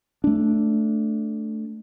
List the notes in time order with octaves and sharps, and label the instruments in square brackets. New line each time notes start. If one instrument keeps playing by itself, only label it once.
[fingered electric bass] A3 D4